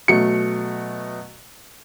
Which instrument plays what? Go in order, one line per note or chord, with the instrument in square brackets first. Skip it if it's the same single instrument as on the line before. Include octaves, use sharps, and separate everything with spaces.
[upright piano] B2 F#3 A3 C#7